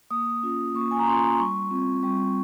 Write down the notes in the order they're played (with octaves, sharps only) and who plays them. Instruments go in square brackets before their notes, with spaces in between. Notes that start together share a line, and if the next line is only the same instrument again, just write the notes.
[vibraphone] A#3 D#6
C#4 F4
A#3 C#6
G#5
A#5
C#4 F4 C6
G3 C#6
C4 F4
G3 C#6